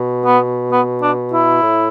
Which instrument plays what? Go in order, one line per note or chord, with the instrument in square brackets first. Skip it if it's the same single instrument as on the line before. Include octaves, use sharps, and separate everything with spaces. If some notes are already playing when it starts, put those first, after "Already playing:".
Already playing: [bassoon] B2
[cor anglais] B3
B3
D4
E4
[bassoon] A2